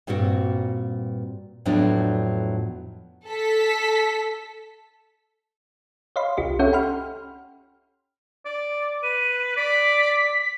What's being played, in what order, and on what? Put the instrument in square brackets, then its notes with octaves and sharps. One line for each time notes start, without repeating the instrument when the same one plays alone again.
[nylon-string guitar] G2 A#2 A#3 C4 F#4
F2 A2 F3 F#3 B3 D4
[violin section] A4 B6
[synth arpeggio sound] C#5 D#5 F5 B5 C6
C2 F4 G4 D#5
C#4 G4 A4 C#5 E5 F#5
G5 B5 C6 F6
[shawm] D5
[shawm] B4 [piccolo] D#7
[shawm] D5 [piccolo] B6